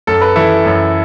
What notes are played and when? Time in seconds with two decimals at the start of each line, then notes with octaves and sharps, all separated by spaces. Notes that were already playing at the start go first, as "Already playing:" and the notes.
0.07 F#2 A4
0.21 B4
0.36 E3 E4 A4
0.66 F#2